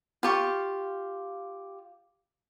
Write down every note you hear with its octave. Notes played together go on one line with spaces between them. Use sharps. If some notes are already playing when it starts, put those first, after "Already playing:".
F4 G4 C#6